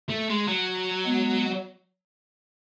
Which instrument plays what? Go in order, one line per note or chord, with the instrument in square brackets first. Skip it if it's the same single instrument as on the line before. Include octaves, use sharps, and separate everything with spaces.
[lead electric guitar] A3
G#3
F#3
[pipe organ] G#3 B3